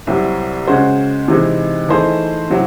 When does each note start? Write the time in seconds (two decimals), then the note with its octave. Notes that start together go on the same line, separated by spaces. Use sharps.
0.07 C2 C3 F#3 C4 E4
0.68 C#3 G#3 C#4 F#4 C5
1.28 C3 E3 G#3 C4 D#4
1.88 E3 A3 D#4 G#4 C5
2.50 C3 F#3 C4 E4